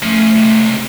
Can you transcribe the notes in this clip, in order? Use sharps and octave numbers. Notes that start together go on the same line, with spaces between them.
F3 A3 C#4
C#2 C3